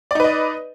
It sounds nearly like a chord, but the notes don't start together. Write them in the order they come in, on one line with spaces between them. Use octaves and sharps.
D5 D#4 B4 D#5